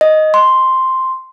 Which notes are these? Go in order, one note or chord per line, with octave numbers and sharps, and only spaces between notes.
D#5
C6